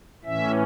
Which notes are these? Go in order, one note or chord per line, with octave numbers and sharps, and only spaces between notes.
A2 E3 C#4 E5